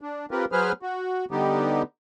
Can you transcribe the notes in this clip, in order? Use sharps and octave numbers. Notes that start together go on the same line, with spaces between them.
D4
C4 F4 G4 A#4 B4
F#3 G#4 B4 C5 F6
F#4
D3 G3 B3 D#4 G4